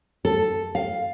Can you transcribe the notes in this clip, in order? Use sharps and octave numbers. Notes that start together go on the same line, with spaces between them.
A4
F5